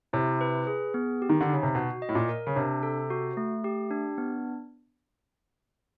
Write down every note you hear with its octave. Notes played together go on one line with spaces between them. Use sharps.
C3 E4
B4
G#4
B3
G4
D#3
D3
C#3 D#4
C3
B2 F#4
D#5
A2
A#2
A#4
C#3
C3 D4
A4
F#4
A3
G4
D4
B3